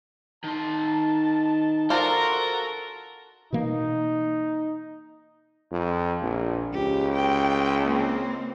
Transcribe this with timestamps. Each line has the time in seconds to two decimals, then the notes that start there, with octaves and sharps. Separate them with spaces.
0.44 D#3 A5 C6
1.90 F4 F#4 A4 A#4 C5 D5 A#5
3.53 B2 E3 A#3 D#4
5.72 F2
6.22 A#1
6.73 C#2 G4
7.15 G5
7.86 A#3 C4